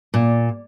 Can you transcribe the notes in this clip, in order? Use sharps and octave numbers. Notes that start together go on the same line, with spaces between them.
A#2